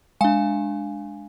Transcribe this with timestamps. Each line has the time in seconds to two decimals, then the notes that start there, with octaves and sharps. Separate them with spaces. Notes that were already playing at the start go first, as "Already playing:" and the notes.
0.21 G#3 D4 F5 G#5